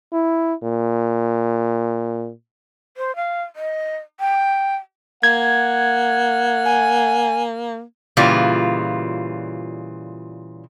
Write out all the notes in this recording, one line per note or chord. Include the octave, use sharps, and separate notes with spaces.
E4
A#2
C5
F5
D#5
G5
A#3 F#5 G#6
G#5
A#2 C#3 E3 G3 F4